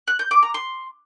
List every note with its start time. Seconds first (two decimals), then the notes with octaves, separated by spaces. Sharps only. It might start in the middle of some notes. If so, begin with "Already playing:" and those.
0.08 F#6
0.19 G6
0.31 D6
0.43 A#5
0.54 C6